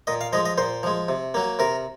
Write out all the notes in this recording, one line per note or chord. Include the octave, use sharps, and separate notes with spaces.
A#2 D#5
F5
F3 G#3 D#5
D#5
A#2 C5
F3 G#3
C3
F#3 A#3
C3 A#4